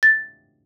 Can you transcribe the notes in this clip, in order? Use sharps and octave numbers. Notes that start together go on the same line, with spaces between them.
A6